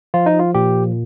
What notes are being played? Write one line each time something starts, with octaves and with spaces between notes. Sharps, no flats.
F3 F4
D#4
F4
A#2 G4